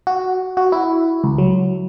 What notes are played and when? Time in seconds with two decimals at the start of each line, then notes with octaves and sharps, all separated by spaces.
0.07 F#4
0.57 F#4
0.72 E4
1.24 C#2
1.38 F#3